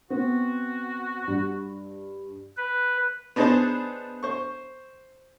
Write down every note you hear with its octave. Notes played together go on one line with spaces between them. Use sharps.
B3 C4 F#4
G2
B4
B3 D4 D#4 G#4 C5 A5
C5 C#6